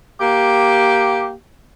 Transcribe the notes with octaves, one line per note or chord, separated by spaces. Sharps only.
A#3 G4